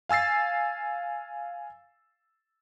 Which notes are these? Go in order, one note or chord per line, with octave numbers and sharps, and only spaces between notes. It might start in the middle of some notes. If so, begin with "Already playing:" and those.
F5 G#5 E6 A6 C7